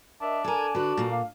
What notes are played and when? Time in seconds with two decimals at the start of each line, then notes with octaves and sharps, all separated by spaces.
0.21 D4 A#4 D#5 E5
0.44 A4 A#4 G#5
0.75 D3 F#4 B4
0.97 A#2 A#3
1.11 F5